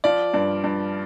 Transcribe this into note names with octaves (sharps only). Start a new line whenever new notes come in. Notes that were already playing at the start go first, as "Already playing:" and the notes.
F3 D5
G2
G2